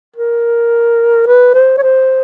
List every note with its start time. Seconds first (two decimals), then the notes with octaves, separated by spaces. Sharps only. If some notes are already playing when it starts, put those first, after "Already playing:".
0.16 A#4
1.27 B4
1.54 C5
1.78 C#5
1.82 C5